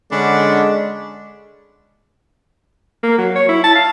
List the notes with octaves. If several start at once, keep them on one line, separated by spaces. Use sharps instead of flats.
D3 G#3 C#4 D4 F#5 B5
A#3
F#3
C#5
E4
A5
F5